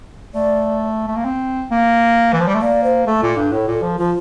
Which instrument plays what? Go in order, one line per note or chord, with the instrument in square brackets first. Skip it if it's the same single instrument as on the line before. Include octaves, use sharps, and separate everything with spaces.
[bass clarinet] A3 [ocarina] D5
[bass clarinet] A3
A#3
C4
A#3
E3
F3
G3
A3
[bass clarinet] A#3 [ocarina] D5
[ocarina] C5
[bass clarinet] A3 [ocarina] A4
[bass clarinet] A#2
G2
A2
A#2
F3
[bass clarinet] F3 [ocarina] F4